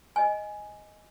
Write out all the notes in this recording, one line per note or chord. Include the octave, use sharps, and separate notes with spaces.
D#5 G#5